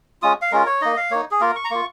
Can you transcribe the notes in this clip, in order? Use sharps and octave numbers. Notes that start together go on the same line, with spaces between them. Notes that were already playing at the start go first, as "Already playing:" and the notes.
G#3 C#4 F4 D#6
F5
G#3 C#4 F4 A#4
C#5
A#3 D#4 D#5
F5
A#3 D#4 C#5
G#4
A#3 F4 A#4
C#6
A#5
A#3 F4 C#6